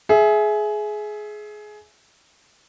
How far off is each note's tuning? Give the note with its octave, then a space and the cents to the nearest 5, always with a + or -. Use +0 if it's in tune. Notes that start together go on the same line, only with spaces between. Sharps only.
G#4 +20 E5 +0